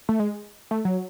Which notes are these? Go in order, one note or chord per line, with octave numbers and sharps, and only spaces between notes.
A3
G#3
A3
F#3